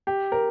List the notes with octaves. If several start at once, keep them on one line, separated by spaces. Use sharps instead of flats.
G4
A#4